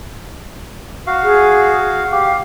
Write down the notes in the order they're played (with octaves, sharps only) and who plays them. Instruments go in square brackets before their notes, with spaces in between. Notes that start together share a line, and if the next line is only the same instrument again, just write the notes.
[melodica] F#4 F5
[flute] G#4
[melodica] G4 [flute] F5